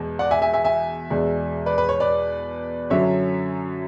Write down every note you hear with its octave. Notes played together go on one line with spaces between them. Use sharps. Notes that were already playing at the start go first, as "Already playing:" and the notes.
Already playing: E2 B2 G#3
D5 F#5
E5 G#5
E5 G#5
E5 G#5
E5 G#5
E2 B2 G#3 D4
B4 D5
B4
C#5
B4 D5
F#2 D3 F#3 C#4 C#5 E5